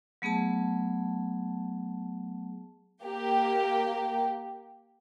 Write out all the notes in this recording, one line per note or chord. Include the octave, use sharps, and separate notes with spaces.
F#3 A3 B3 G#4 A5
A#3 G4 G5